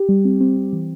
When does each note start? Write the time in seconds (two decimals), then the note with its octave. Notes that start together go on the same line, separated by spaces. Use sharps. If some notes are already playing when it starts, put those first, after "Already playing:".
Already playing: G4
0.09 G3
0.25 C4
0.41 C4
0.57 C4
0.73 E3